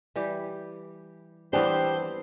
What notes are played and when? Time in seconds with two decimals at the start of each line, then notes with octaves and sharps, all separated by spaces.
0.16 E3 G3 G4
1.53 E3 G3 B3 C4 D4 G4 C5